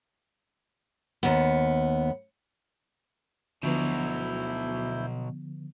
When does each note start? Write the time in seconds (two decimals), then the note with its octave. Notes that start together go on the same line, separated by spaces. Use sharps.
1.23 D#2 B3
3.63 D2 B2 D3 F3 F#3 B3 E4 G6